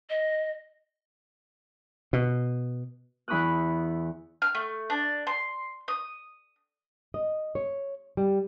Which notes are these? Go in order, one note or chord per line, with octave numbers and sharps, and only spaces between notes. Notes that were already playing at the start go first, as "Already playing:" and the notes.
D#5
B2
E2 E4 B5 C#6 D#6 F#6
F6
A3
D4
C6
D#6
D#5
C#5
G3